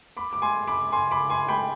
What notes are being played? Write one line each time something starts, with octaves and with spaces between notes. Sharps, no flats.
B5 D6
D6
G#5 C6
B5 D6
G#5 C6
B5 D6
G#5 C6
G5 B5